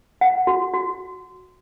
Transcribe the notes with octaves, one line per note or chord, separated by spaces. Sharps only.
F#5
F#4
F#4